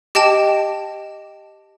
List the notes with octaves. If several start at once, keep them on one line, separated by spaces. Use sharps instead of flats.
G4 D#5 G5 A5 E7